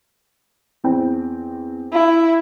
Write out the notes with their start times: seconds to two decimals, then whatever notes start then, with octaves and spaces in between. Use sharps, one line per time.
0.84 E2 C4 G5
1.93 E4